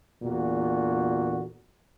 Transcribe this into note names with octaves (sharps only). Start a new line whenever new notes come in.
E2 A#2 D3 F#4